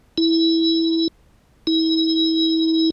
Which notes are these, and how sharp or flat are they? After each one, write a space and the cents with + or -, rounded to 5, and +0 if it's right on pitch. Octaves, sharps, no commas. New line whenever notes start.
E4 -10
E4 -35